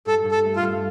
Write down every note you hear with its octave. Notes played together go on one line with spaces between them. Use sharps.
G2 A4
G2
A4
A3
F4
G2